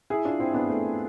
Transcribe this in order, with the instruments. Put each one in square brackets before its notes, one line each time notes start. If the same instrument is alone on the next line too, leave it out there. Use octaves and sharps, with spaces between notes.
[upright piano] E4 G#4
D4 F4
C4 E4
B3 D4
A3 C4